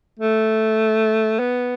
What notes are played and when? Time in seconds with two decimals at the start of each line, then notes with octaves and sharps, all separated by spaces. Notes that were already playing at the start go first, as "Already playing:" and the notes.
0.20 A3
1.39 B3